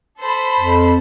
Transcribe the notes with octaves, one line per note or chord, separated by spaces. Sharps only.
A4 C5 B5
F2